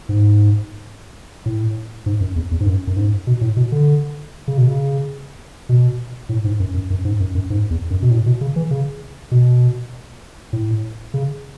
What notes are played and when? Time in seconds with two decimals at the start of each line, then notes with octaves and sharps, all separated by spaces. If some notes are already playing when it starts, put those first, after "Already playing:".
0.09 G#2
1.46 A2
2.06 G#2
2.21 F#2
2.36 E2
2.51 E2
2.60 G#2
2.66 F#2
2.87 F#2
2.96 G#2
3.27 B2
3.41 A2
3.57 B2
3.72 D3
4.48 C#3
4.58 B2
4.67 C#3
5.69 B2
6.29 A2
6.44 G#2
6.60 F#2
6.74 F#2
6.90 F#2
7.05 G#2
7.20 F#2
7.35 F#2
7.50 G#2
7.71 E2
7.90 F#2
8.02 B2
8.11 A2
8.26 B2
8.41 C#3
8.56 E3
8.71 C#3
9.32 B2
10.53 A2
11.14 C#3